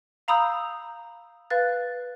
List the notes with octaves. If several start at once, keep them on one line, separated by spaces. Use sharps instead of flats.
F5 A#5 B5 D#6 E6 G6
B4 F5 F#6 A6